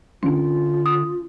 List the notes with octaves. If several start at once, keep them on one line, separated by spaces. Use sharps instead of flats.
D3 C#4 D4 F4
D#6